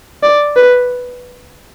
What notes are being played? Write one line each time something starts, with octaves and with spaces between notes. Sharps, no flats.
D5
B4